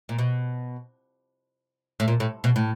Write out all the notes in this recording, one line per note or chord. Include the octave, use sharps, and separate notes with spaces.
A#2
B2
A2
A#2
A2
B2
A2